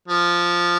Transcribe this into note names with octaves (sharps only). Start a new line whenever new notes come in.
F3